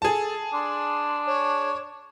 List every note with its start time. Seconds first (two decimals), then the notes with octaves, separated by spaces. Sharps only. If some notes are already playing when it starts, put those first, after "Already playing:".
0.02 G#4 A4 A5
0.53 D4 C6
1.26 C#5